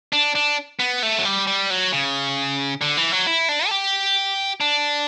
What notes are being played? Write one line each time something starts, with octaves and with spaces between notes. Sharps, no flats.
D4
D4
B3
A3
F#3
G3
G3
F#3
C#3
D3
E3
F#3
E4
D4
A4
G4
D4